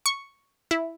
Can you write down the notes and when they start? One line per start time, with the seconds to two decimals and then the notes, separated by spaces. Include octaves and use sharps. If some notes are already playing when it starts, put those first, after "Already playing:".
0.06 C#6
0.71 E4